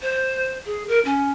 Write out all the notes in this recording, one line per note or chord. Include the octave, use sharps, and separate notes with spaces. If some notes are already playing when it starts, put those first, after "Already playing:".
C5
G#4
A#4
C#4